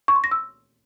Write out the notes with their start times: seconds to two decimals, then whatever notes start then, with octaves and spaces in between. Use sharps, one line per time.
0.08 C#6
0.16 C6
0.24 A#6
0.31 E6